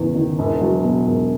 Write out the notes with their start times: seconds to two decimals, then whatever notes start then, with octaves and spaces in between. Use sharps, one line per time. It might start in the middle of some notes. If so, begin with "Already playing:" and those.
Already playing: F#1 E2
0.15 D#3
0.39 E1
0.61 F#3
0.84 B2
1.07 E1